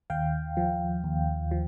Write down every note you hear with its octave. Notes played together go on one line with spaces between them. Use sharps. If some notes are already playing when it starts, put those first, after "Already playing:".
D#2 F5 G5
F3
D#2
F3